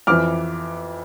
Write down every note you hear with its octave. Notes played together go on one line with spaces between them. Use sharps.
F2 E3 D6 F6